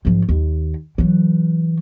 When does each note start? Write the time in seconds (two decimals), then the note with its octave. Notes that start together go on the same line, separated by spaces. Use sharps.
0.05 G#1 F3
0.29 D#2
0.98 E3 F#3